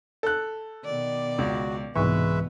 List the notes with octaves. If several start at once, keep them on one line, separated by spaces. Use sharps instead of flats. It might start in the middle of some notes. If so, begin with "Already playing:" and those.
A4 F#6
B2 D#3 D5
C#2 F#4
C2 G#2 B2 E3 G#3 B4 E5 C#6